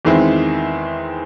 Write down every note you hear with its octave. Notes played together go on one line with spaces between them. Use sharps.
E2 D#3 G#3 C4 E4